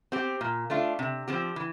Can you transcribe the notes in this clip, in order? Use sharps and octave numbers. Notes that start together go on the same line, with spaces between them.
C4 G4
A#2
A3 D4 F4
C3
F3 C4 G4
E3